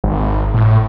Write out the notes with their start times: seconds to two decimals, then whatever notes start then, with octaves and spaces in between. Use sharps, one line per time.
0.04 G#1
0.54 A2